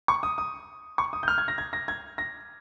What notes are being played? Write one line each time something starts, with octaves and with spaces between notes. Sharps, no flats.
C#6
D#6
D#6
C#6
D#6
G6
F6
G#6
A#6
G#6
A#6
G#6
A#6